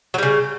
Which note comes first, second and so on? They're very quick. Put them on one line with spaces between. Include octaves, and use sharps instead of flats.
F#3 G3 C#3